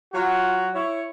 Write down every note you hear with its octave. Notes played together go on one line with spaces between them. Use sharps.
F#3 F4 F#4
E4 C#5